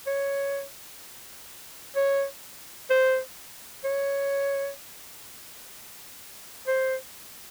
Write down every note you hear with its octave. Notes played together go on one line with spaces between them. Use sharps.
C#5
C#5
C5
C#5
C5